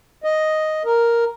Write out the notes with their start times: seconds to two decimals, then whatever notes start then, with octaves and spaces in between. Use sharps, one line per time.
0.24 D#5
0.85 A#4